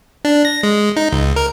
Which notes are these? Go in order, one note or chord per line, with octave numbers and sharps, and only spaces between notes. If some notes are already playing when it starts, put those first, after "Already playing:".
D4
A#6
G#3
D#4
C#2
A#4